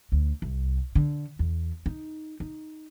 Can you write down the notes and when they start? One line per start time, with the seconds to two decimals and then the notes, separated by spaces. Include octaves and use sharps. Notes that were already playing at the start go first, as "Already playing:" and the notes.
0.12 D2
0.42 C2
0.95 D3
1.39 E2
1.86 D#4
2.40 D#4